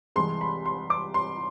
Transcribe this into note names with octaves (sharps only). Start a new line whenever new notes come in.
C2 C3 E3 G#3 C6
B5
C6
D6
C6